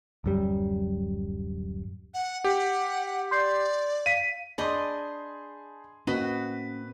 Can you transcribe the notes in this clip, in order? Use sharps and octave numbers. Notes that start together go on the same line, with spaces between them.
D1 F#2 G3
F#5
G4 F#5
D5 C6 G6 C7
F5 B6 D#7
D4 G#4 D#5 A5 B5 C6 G6
A2 A#3 C4 C#4 F#4 B4 D#5